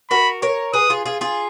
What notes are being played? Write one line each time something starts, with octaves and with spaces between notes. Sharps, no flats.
F#4 A#4 B5
A#4 C#5
G#4 B4 D#6
F4 G#4
F4 G#4
F4 G#4